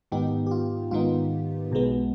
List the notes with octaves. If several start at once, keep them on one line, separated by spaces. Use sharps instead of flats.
G#2 D#3 B3 D#4 G4
G4
F4
G#2 D#3 B3 D#4 F4
B1 B2 G#3 B3